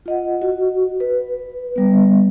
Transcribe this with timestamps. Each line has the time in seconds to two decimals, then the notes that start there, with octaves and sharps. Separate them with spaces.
0.06 F4 D#5 F#5
0.42 F#4
1.00 B4
1.76 G3 B3